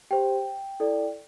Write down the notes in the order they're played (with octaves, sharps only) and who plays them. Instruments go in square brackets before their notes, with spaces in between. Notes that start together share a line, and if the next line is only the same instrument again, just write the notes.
[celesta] G4 C5 G5
E4 A4 D5